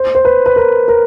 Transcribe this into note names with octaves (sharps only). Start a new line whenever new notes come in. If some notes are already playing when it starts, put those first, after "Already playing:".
Already playing: C5
C5
B4
B4
A#4
A#4